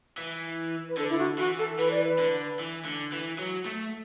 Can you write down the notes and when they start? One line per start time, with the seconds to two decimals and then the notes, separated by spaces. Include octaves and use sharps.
0.18 E3
0.89 B4
0.98 D3 A4
1.10 E4
1.18 F#4
1.38 E3 F#4
1.59 A4
1.78 E3 B4
1.91 D5
2.04 B4
2.19 D3
2.60 E3
2.85 D3
3.13 E3
3.39 F#3
3.66 A3